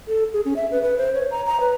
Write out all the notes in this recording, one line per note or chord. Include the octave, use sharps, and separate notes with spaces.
A4
G#4
C#4
E5
B4
B4
C5
C#5
A#5
A#5
B4